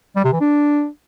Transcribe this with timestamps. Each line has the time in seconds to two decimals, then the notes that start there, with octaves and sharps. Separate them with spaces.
0.16 G3
0.24 C3
0.32 E3
0.41 D4